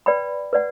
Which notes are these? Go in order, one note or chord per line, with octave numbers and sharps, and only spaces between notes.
B4 D5 G5 B5
B4 D5 F#5